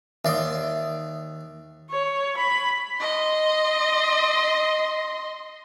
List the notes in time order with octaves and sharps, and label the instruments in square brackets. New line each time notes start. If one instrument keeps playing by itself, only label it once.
[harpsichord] D#2 D5 C6 [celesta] E5 D#6
[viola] C#5
B5
[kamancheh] D#5 C6